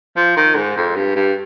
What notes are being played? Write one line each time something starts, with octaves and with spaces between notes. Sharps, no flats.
F3
D#3
G#2
F2
G2
G2